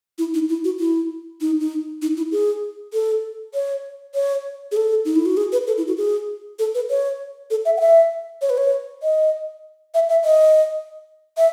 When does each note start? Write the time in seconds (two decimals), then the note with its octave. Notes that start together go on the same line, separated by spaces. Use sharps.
0.18 E4
0.34 D#4
0.49 E4
0.64 F#4
0.80 E4
1.41 D#4
1.60 D#4
2.02 D#4
2.17 E4
2.32 G#4
2.93 A4
3.54 C#5
4.14 C#5
4.71 G#4
4.77 A4
5.05 D#4
5.15 E4
5.26 F#4
5.37 G#4
5.52 B4
5.67 A4
5.77 E4
5.87 F#4
5.97 G#4
6.59 A4
6.74 B4
6.90 C#5
7.50 A4
7.65 E5
7.77 F#5
7.81 E5
8.41 C#5
8.50 B4
8.57 C#5
9.03 D#5
9.94 E5
10.09 E5
10.24 D#5
11.37 E5